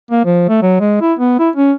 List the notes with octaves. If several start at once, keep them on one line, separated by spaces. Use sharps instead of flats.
A#3
F3
A3
F#3
G#3
E4
B3
E4
C#4